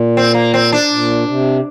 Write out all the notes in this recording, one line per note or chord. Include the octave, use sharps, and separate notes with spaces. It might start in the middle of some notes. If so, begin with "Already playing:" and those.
Already playing: A#2
C4
A#3
C4
D4
A#2
C3